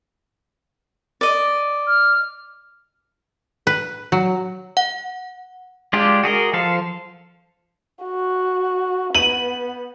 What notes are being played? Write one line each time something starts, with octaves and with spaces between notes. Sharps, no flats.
D5 D#5
F6
B4
F#3
F#5
G#3 D4 F4 G4
F#4 G#4 A#4 D#5
F3 A4 C5 F5
F#4
B3 D#7 F#7